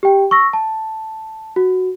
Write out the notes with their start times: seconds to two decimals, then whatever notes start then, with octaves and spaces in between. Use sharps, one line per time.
0.03 G4 G5
0.31 C#6 E6 A#6
0.53 A5
1.56 F#4